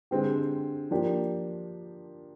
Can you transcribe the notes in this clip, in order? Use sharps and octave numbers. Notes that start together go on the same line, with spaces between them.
D3 G#3 C4 G4
F3 A#3 D4 G4